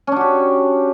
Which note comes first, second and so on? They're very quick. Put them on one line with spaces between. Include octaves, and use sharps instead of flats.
C#4 D4 F#4 G4